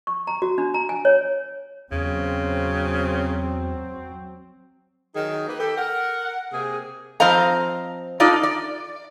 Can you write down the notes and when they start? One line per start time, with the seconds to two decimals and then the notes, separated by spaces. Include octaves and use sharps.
0.07 C#6
0.27 A#5
0.42 F#4
0.58 D4
0.74 A#5
0.89 G#5
1.05 C#5
1.92 E2 C#3 F#3 C4
5.15 D#3 F#3 D#4 G#4
5.48 A#3 B4
5.59 G4 A4
5.77 A#4 F#5
6.52 C3 A#3 G#4
7.20 F3 C4 C5 D#5 F5 A#5
8.20 D4 D#4 F4 A4 D5
8.43 D5